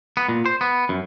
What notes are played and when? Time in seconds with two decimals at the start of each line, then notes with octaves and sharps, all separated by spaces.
0.17 B3
0.29 A#2
0.46 C5
0.61 B3
0.89 F#2